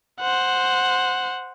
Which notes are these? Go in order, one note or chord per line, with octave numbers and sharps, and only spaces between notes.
C5 F#5